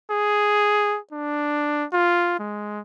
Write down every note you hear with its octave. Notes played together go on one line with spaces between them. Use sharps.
G#4
D4
F4
G#3